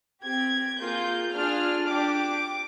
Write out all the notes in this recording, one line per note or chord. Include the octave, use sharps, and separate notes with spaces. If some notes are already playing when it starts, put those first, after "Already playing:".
C4 G4 G#6
A#3 F4 G#4 G6
D4 F4 G#4 F6
D4 G4 D6